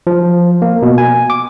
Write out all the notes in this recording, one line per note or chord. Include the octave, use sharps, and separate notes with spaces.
F3
A#3
B2
G#5
D6